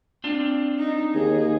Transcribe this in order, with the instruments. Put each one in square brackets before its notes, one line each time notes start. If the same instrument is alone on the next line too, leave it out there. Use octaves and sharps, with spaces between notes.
[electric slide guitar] C4 D4 F4
[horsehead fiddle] D#4
[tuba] D#2 [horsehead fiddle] G#4